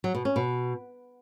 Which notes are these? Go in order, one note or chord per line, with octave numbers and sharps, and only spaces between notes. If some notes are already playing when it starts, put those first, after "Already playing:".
F#3
B2
C#4
B2